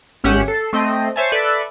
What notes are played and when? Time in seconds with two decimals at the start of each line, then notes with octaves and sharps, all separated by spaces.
0.24 G#1 C#4 G4 E5 F#5 C#7
0.48 A4 C7
0.73 A3 C4 D#5
1.16 C5 C#5 E5 G#5 A5
1.32 A4 B4 D5 E5